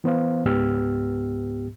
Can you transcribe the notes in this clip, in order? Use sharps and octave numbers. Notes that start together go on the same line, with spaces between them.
E3 B3 C5 F5
C#2 G#2 B3 G4 E6 F6